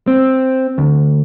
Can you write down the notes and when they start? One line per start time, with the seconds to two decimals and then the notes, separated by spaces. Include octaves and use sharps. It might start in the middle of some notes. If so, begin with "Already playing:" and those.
0.08 C4
0.78 D2